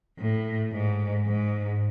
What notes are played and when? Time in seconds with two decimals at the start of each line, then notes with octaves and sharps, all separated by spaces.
0.18 A2
0.72 G#2
1.26 G#2